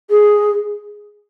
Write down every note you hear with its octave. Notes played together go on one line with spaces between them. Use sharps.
G#4